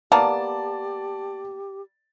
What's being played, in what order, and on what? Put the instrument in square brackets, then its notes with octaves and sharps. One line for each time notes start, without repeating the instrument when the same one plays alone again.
[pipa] A#3 B3 [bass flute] G4 [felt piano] D5 [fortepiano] A5